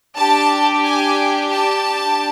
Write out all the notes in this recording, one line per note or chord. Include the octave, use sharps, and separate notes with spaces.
D4 G4 A5
G#5
A5